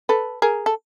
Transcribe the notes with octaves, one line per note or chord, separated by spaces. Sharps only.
A4 B4
G#4 A#4
A4